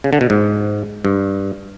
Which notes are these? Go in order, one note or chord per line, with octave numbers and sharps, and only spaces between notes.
C#3
D3
B2
G#2
G2